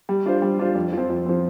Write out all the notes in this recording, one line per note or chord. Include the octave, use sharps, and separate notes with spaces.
G3
D4 F4 C5
G3
D4 F4 C5
F2
F3
C4
F2
F3 C4